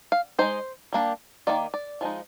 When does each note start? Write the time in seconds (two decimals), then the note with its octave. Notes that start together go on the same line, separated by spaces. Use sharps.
0.12 F5
0.39 G#3 D#4 C5
0.93 G3 A#3 D4
1.47 D#3 A#3 D#4 D5
1.74 D5
2.01 F3 G#3 D#4